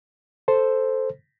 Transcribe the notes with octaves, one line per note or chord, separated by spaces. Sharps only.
A4 C5